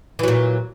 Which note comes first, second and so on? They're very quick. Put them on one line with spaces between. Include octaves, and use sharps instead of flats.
E3 F#3 A#2